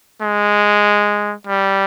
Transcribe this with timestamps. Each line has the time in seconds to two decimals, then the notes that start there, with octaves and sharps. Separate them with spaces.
0.22 G#3
1.47 G3